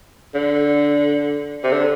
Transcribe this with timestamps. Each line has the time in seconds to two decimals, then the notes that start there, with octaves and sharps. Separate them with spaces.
0.35 D3
1.64 C3
1.72 D3